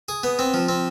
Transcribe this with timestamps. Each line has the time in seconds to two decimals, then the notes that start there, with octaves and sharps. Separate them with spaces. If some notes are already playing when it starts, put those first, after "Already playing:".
0.09 G#4
0.23 B3
0.39 C4
0.54 F3
0.69 C4